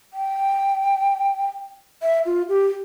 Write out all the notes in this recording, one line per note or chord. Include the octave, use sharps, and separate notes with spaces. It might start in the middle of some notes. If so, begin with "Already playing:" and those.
G5
E5
F4
G4